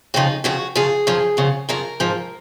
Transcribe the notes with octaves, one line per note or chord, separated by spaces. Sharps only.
F2 C#3 F3 D#4
F2 C#3 F3 F#4
F#2 C#3 F3 G#4
F#2 C#3 F3
F#2 C#3 F3
F#2 C#3 F3 A#4
G#2 F3